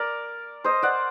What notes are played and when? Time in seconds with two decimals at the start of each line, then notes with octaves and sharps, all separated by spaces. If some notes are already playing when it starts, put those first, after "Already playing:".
Already playing: A#4 D5
0.64 C5 D#5
0.82 D5 F#5